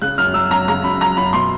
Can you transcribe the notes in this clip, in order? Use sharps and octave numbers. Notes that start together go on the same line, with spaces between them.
C#3 F#6
F#2 F6
F#3 E6
F#2 A#5
C#3 A#5
F#2 B5
F#3 A#5
F#2 B5
B2 C6